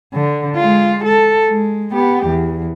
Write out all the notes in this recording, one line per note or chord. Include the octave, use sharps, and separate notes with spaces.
D3
G#3 F4
A4
G#3
B3 G4
E2